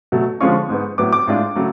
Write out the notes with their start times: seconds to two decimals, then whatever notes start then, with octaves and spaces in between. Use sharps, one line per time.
0.12 B2 F#3 A3
0.40 D3 F3 G#3 C#4 F4 C#6
0.69 G#2 G#3 B3
0.98 A2 F#3 B3 D6
1.13 D6
1.27 A2 G#3 D4 F4
1.56 C#3 F#3 A3